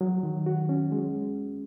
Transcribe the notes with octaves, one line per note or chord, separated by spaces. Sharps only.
F#3
D#3
F#4
C#4
G#3